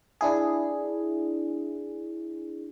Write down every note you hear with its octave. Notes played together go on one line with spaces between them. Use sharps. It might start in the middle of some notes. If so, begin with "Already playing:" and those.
D4 E4 G#4